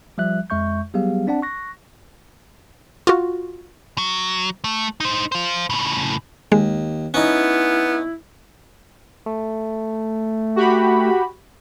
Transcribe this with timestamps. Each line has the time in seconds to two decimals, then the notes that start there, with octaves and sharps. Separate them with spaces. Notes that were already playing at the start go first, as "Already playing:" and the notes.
0.18 F3 G3 E5 F#6
0.50 F2 G#3 E5 C#6 G6
0.94 F#3 G3 B3 G4 G#4 F5
1.27 C4 D4 D5 F#5 A5
1.42 C#6 F#6 A#6
3.07 F4 F#4
3.98 F#3
4.64 A3
5.00 D#4 C5
5.32 C5 F5
5.70 A2 C#3
6.52 D#2 G#3
7.14 B3 C#4 D#4 E4
9.26 A3
10.56 F#4 G4 B5